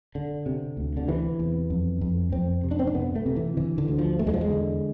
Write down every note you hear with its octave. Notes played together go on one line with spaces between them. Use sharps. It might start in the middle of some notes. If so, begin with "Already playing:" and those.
D3
C3
D2
D3
C3 E3
E2
F2
F2
F2 C4
C3
D4
C4
D4
C3 B3
A3
C3
E3
D3 E3
D3
D2
F3
E2 A3
G#3
F3
G#3
D3